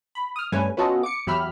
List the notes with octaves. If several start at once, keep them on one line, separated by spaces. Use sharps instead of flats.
B5
D#6 F6
G2 G3 A3 C#4 B4 G#5
B3 C#4 F4 F#4 A4 D#5
D6 C#7
E2 F#3 G4 E5 B5 F6